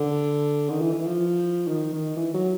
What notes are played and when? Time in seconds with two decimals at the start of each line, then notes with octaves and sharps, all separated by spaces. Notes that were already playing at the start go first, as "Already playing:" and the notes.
Already playing: D3
0.69 D#3
0.81 E3
0.93 E3
1.06 F3
1.68 D#3
1.93 D#3
2.17 E3
2.34 F#3